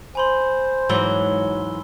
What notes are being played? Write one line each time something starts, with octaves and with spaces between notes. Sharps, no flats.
C5 G#5 B5 C6
G#2 E3 F#3 B5 E6 G7